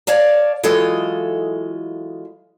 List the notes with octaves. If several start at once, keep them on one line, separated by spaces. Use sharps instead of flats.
C#5 D5 F5 A5
E3 F#3 G#3 F4 A4 D#5